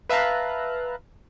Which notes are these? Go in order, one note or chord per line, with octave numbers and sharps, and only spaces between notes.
B4 E5 F5 A5 A#5 F#6